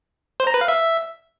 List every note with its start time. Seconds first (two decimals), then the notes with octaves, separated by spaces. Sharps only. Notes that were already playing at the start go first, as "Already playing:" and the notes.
0.40 C5
0.47 A#5
0.54 B4
0.61 F5
0.68 E5